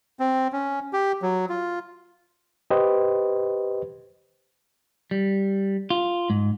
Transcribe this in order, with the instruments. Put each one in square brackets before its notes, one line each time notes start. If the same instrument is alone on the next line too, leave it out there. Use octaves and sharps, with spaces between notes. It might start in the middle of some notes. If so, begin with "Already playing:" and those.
[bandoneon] C4
C#4
G4
F#3
F4
[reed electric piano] G4 B4 C5 D#5
[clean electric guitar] G3
F4
G#2